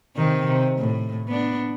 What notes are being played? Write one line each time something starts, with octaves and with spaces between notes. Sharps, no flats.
C3 D#3
C3
A2
B3 D4